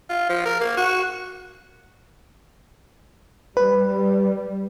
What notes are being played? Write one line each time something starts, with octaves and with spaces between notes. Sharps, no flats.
F4
F3
A#4
A#3
F#4
G3 B4